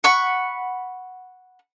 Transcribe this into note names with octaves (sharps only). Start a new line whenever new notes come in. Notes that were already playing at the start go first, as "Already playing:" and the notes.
F#5 B5 C#6